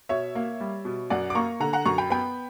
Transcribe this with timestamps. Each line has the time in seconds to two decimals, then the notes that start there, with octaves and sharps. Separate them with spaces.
0.09 B2 C#5 E5
0.35 A#3
0.60 G3
0.85 B2
1.10 F#2 D5 F#5
1.30 D6
1.35 A#3 A#5 C#6
1.60 D3 F#5 A#5
1.73 F#5 A#5
1.86 F#2 A#5 C#6
1.98 G5 B5
2.10 B3 G5 B5